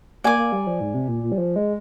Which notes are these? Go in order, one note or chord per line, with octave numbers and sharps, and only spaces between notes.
A#3 D5 G#5 D6
A#3
G3
F3
G#2
C3
A#2
A#2
G3
F3
G#3